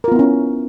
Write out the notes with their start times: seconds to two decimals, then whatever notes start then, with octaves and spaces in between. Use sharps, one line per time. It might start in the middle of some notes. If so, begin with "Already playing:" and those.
0.04 A#4
0.08 F4
0.12 B3
0.15 E4
0.19 C#4